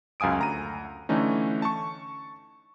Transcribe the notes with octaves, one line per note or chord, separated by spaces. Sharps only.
C#2 F#2 F5 G#5 D#6 D7
D2 A#5 D#7
D3 E3 A3 C#4 D#4
A5 C#6